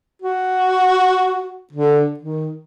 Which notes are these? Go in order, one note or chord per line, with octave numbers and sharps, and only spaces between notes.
F#4
D3
D#3